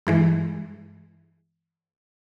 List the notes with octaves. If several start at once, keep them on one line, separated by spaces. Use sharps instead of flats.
G2 E3 G#3